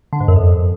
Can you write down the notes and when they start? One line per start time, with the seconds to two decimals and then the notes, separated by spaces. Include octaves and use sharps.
0.13 D3
0.20 G#2
0.28 F#2
0.36 F2